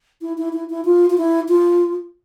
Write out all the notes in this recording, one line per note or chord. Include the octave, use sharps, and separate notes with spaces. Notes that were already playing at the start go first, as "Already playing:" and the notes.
E4
E4
E4
E4
F4
F4
E4
F4